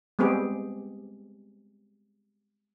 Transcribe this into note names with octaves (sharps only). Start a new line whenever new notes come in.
G3 G#3 B3 C4 G4 G#4